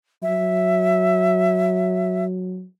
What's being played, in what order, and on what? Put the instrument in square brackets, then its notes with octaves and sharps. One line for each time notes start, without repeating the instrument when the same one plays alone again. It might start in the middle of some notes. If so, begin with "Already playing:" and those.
[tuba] F#3 [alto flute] E5